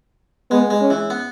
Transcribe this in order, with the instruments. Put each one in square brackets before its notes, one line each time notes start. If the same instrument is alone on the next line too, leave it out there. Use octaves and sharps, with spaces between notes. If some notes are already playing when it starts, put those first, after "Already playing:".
[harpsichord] G#3 [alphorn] B3
[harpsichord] G#3
[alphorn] C#4
[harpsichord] E3
B3